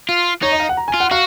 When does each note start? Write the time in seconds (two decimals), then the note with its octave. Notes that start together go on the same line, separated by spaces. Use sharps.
0.09 F4
0.43 D#4 C#5
0.52 D#5
0.60 F5
0.69 F#5
0.77 A#5
0.88 G#5
0.94 F4
1.00 F#5
1.11 F#4 F5